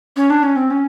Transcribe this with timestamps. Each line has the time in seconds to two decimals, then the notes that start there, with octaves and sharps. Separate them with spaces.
0.17 C#4
0.30 D4
0.43 C#4
0.56 C4
0.70 C#4